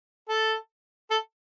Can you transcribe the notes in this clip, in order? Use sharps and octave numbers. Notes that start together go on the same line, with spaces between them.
A4
A4